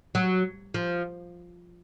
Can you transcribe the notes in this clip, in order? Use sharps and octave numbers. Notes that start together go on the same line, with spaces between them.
F#3
F3